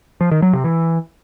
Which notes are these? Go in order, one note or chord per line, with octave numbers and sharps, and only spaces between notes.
F3
D#3
F#3
C3
E3